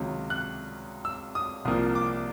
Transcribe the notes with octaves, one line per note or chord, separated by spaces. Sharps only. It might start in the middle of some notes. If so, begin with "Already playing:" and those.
Already playing: C#2 C3 D#3 F#3
F#6
E6
D#6
C2 C3 F3 A#3 D#6
D6